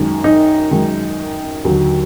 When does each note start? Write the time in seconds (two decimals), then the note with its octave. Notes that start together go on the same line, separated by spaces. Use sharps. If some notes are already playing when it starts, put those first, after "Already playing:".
Already playing: F#2 D#3 G#3
0.24 D#4
0.71 F#2 D#3 G#3
1.65 D#2 D3 F#3